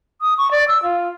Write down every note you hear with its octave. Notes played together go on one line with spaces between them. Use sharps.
D#6
C#6
D5
E6
F4